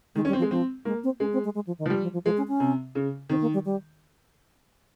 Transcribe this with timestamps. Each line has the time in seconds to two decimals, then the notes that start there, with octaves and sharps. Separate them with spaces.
0.15 D#3 G#3
0.25 C#4
0.28 G3
0.33 C4
0.38 F3
0.42 G#3
0.51 F3 C4
0.85 G#3 A#3
1.03 C4
1.20 G#3 C#4
1.33 C4
1.44 G#3
1.55 G#3
1.67 F3
1.79 D#3
1.86 F3
1.90 G3
2.02 F3
2.13 F3
2.25 F3 G#3
2.37 C#4
2.48 C#4
2.60 C3
2.95 C#3
3.29 D#3 C4
3.41 A#3
3.53 G3
3.65 G3